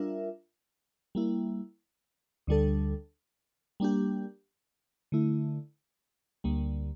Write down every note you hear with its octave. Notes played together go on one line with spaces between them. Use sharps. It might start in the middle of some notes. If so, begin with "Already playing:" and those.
Already playing: G3 D4 F4 A#4 E5
G3 A#3 E4
D2 D3 G3 D4 A4
G3 A#3 D4 G4
D3 A3 E4
D2 D3 G3 A#3